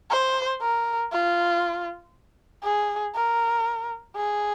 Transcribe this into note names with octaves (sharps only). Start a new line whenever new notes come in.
C5
A#4
F4
G#4
A#4
G#4